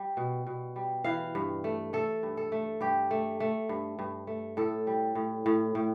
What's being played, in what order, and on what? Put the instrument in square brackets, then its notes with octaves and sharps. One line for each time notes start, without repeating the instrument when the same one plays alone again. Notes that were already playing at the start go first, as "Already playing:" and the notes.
Already playing: [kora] G3
B2
B2
G3
E3 F5
G2
A3
A3 A4
G2
A4
A3
G2 G4
A3
A3
G2
G2
A3
A2 A4
G3
A2
A2
A2